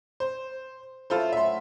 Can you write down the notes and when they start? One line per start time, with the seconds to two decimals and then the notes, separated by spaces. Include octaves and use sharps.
0.20 C5
1.10 F#2 E4 F4 A4 C5 A5
1.33 A2 E5 F#5 C6